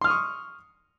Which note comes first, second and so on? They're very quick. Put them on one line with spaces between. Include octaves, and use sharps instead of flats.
C6 F6 D#6 C#6